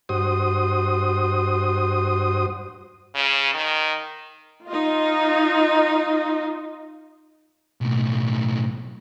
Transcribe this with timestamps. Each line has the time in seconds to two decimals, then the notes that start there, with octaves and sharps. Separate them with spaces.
0.09 G2 F#4 C5 D#6
3.15 C#3
3.54 D#3
4.67 D#4 F4 D#5
7.81 B1 A2